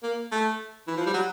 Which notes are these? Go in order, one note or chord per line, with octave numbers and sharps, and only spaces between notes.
A#3
A3
E3
F3
G3
F#3